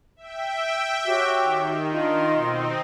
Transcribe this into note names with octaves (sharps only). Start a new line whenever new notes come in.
E5 G5
F#4 G4 C#5 D6
D#3
D4 F4 D#5 C6
B2 C4 D#4